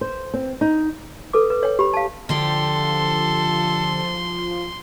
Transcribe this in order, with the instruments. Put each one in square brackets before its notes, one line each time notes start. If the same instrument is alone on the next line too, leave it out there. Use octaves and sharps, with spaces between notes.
[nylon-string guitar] C5
C4
D#4
[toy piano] A4 B4 D6
B4
C#5 G5
G4 B5
F5 A5
[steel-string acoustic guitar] D3 D4 G4 [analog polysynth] F3 [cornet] A4 [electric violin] C6